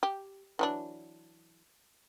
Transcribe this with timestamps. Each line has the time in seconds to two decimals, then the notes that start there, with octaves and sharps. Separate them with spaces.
0.03 G4
0.59 E3 F#3 D4